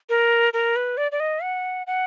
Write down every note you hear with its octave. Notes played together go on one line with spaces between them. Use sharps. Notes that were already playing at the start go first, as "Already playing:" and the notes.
A#4
A#4
B4
D5
D5
D#5
F#5
F#5